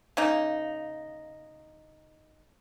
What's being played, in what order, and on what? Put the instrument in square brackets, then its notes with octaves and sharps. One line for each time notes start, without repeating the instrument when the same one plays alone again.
[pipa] C#3 A#3 D#4